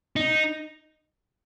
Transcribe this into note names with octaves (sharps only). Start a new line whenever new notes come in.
D#4